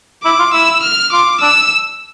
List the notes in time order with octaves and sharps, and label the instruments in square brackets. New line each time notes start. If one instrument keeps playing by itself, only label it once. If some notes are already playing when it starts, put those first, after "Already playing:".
[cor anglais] E4 [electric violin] D6
[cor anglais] F4
[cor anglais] E4 [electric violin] E6
[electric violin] F6
[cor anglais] F4 [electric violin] D6
[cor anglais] D4 [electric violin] E6